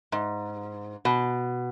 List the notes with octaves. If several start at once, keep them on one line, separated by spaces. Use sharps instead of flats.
G#2
B2